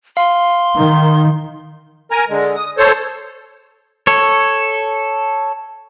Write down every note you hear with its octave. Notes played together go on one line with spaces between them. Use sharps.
F5 C6
D#3
A#4 G#5 A#5
D3 G#3
D#6
A4 C5 C#5
A4 C#5